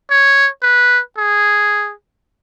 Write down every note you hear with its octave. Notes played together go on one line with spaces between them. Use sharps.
C#5
B4
G#4